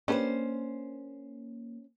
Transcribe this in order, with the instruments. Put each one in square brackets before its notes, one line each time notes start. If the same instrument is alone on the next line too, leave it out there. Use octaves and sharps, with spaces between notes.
[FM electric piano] A#3 [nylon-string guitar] C#4 C5 [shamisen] D4 G4 B4